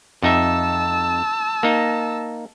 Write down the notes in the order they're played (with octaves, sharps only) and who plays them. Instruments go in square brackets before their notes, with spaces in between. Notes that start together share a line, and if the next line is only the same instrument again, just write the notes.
[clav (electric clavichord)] F2 D#4 E5 [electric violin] A5 E6
[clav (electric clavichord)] A#3 D#4